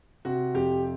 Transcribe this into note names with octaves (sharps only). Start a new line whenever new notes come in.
C3 F#4
F2 G4